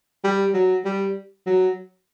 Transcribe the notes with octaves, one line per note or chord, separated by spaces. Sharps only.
G3
F#3
G3
F#3